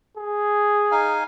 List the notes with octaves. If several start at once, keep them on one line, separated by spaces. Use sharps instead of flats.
G#4
D#4 F5 G#5